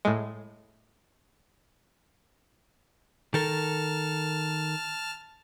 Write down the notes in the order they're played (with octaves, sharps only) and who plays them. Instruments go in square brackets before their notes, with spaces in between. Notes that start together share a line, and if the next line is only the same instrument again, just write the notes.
[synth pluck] A2 G#3
[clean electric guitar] D#3 A4 A#4 [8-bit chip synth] A5 F6